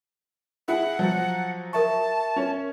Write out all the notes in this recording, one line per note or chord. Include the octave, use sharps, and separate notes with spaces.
E4 G#4 F#5
F3 F#3
A#4 E5 A5 C#6
C#4 C#5